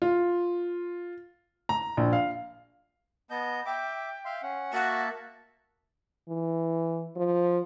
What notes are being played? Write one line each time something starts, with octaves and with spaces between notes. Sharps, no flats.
F4
A#5
A#1
F5
B3 D#5 A5 G6
E5 G5 D6
E5 F5 C6
C#4 F#5
A#3 F#4 E5 A5
E3
F3